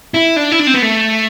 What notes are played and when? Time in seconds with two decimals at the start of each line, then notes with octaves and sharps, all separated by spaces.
0.14 E4
0.36 D4
0.52 E4
0.59 D4
0.67 C4
0.74 B3
0.82 A3